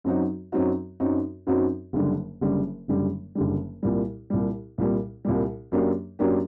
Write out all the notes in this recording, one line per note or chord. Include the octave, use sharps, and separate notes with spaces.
F#2 F#3 C4 D#4 F#4
F#2 F#3 C4 D#4 F#4
F#2 F#3 C4 D#4 F#4
F#2 F#3 C4 D#4 F#4
F#1 F#2 D3 G3
F#1 F#2 D3 G3
F#1 F#2 D3 G3
F#1 F#2 D3 G3
C2 A#2 G3
C2 A#2 G3
C2 A#2 G3
C2 A#2 G3
F#2 F#3 A#3 D4 G4
F#2 F#3 A#3 D4 G4